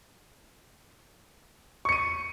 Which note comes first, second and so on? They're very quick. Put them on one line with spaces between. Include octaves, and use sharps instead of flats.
C#6 C#7 D#7